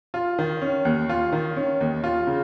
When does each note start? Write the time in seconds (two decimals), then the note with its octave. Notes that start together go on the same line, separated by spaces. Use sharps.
0.14 F4
0.39 D#3
0.61 C#4
0.85 D#2
1.09 F4
1.32 D#3
1.56 C#4
1.81 D#2
2.04 F4
2.27 C#3